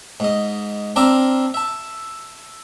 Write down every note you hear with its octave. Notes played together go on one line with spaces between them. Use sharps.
G#2 D#5
C4 D4 E5 F5 A#5 D6
E5 A5